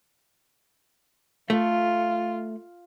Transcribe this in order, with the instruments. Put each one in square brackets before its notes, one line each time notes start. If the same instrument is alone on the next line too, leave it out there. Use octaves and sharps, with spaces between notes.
[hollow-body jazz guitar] A3 [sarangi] F4